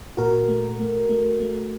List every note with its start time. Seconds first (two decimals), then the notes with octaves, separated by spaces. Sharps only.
0.17 A#2 F#4 A#4
0.48 A3
0.79 A3
1.09 A3
1.40 A3